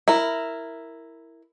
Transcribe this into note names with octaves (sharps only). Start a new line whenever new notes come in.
E4 A#4